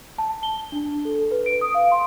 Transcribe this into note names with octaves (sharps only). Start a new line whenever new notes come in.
A5
G7
D4
A4
B4
D7
D#6
F5
C6